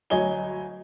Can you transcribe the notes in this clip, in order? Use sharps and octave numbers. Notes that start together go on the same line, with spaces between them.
D2 F#3 C#5 D#5 G#5 G7